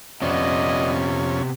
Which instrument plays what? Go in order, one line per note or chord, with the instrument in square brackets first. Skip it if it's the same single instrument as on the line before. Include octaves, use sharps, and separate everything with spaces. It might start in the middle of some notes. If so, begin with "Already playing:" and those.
[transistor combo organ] F2 C#4 [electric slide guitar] C3 B3 [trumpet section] E4 D5 D#5